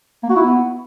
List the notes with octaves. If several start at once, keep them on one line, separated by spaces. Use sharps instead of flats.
A#3
F#4
E4
B3